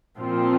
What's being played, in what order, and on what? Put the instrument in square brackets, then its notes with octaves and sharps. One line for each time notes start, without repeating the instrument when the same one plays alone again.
[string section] A#2 F3 C4 F4